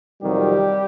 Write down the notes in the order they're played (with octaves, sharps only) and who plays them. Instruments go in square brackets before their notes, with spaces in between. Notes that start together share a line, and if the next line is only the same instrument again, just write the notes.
[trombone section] F2 C3 D#3 F#3 G3 G4